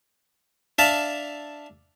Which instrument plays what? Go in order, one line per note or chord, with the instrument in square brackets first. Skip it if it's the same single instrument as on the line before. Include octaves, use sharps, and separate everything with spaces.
[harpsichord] D4 E5 F5 A5